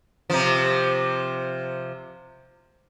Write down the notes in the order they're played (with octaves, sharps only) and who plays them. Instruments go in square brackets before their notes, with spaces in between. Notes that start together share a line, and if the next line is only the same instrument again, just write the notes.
[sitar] C3 F3